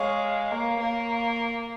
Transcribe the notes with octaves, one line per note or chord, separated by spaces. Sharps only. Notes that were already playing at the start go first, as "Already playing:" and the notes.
Already playing: G#3 C#5 F5
A#3
A#3